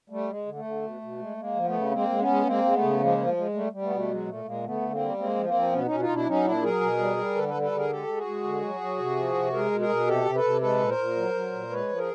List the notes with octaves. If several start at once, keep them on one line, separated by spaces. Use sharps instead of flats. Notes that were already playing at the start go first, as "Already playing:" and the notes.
G3 A3
G#3
D3
A3
D3
B2
B2
G#3
G#3 A#3
F3
A3 B3
C#3
G#3 A#3 C4
G#3
B3 C#4
G#3
G#3 A#3 C4
G#3
A3 B3
C#3
F3 G#3 A#3
F3
G#3
G#3
G3 A3
G3
A3 B3
B2
A3
F#3 G#3
A#2 A3
A#2 G#3 A#3
D3 A3 B3
D3
A#3 C4
G3
G#3 A#3 C4
F3
A#3 C4
F3
B2 B3 C#4
B2 C#4 D#4
D#4 F4
B2 D4 E4
F#3 C#4 D#4
A#2 D4 E4
F#3 G#4 A#4
B2
G3
G3
D3 A4 B4
A4 B4
G3
A4 B4
D3
G#4 A#4
G#3 G4 A4
G#3
F#4 G#4
G#3
D3
F#3
F#3
C3
F3
C3
G#3 G#4 A#4
B2
G#4 A#4
B2
C3 G4 A4
C3
A4 B4
C3
G#3 A4 B4
A#2
A#4 C5
A#2
F#3
F#3
A#2
G#3 B4 C#5
F3
G#4 A#4